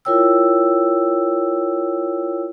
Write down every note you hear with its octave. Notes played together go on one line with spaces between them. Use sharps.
E4 F4 A#4 C#5 G5 E6